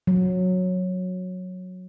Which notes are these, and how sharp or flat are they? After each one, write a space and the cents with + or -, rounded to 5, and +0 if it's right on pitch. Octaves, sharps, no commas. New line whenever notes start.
F#3 -15